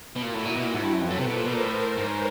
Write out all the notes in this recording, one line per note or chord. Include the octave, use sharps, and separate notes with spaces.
B2
A#2 E4 F#4
A2
A#2
B2
A#2
G#2
G2
F#2 A4 B4
F2
F#2
C3
B2 A#4 C5
A#2
B2
A#2
A2
G#2 B4 C#5